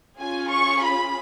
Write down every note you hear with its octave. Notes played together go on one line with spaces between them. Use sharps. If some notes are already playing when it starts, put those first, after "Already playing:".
C#4 F4 G#4 G#5
C#6
B5